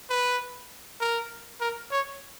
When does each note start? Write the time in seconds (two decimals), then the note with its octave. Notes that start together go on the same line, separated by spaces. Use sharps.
0.10 B4
1.00 A#4
1.61 A#4
1.91 C#5